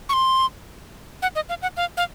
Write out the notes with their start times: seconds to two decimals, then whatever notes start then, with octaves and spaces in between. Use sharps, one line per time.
0.09 C#6
0.13 C6
1.22 F#5
1.36 D#5
1.49 F5
1.62 F#5
1.77 F5
1.97 F5